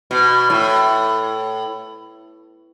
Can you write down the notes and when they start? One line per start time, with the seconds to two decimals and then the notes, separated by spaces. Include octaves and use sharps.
0.11 B2
0.50 A2